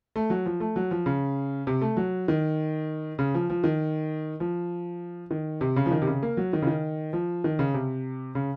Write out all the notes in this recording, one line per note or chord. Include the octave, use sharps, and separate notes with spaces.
A3
F#3
F3
A3
F#3
F3
C#3
C3
A3
F#3
D#3
C#3
F3
F3
D#3
F3
D#3
C3
C#3
F3
D#3
C3
C#3
A#3
F#3
D#3
C#3
D#3
F3
D#3
C#3
C3
C#3